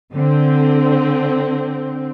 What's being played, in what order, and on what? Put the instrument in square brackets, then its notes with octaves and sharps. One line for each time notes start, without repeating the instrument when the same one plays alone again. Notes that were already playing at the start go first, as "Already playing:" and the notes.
[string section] D3 C4